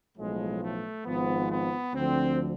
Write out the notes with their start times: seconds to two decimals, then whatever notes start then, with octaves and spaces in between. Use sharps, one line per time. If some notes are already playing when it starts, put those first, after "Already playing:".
0.16 B1 A2 F3 G#3
0.61 A3
1.05 G#1 G#2 F3 B3
1.50 B3
1.94 D2 D3 F3 C4